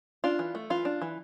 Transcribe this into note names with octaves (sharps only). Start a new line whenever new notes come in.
D4 F4
E3
A3
E3 F4
D4
E3